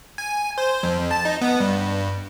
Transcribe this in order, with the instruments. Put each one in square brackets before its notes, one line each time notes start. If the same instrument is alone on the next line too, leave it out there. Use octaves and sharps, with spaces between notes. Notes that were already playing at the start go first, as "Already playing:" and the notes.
[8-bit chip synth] G#5
C5
F2
A5
D#4
B3
G2